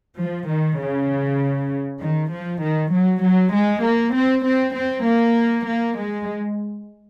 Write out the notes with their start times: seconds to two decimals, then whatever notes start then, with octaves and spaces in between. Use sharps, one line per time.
0.17 F3
0.48 D#3
0.79 C#3
2.00 D#3
2.31 F3
2.61 D#3
2.93 F#3
3.23 F#3
3.54 G#3
3.84 A#3
4.15 C4
4.45 C4
4.75 C4
5.05 A#3
5.67 A#3
5.98 G#3